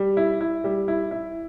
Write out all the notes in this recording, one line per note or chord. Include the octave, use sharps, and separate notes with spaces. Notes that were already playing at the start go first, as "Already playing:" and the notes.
Already playing: G3
E4
E4
G3
E4
E4